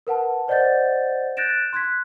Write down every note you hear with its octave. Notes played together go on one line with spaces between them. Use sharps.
A#4 B4 F#5 A5
C5 D5 D#5 F#5 G6 A6
F#6 G6 A6 A#6 D7 E7
C6 F#6 G#6 B6